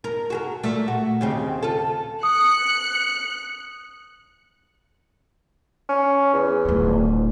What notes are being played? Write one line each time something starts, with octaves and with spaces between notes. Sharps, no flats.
A#4
F#4 G#4 A#4
A#2 A3
F#4
D#2 C#3 C4
F4 A4
D#6 F#6 C#7
C#4
E2
D1 F4